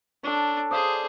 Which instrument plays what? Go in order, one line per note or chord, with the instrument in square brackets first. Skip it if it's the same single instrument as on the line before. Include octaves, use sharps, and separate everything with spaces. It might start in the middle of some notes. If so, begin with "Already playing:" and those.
[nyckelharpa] D4 [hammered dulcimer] A4 C#5
[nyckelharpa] G#4 C5 [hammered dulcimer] D5 D#5 F5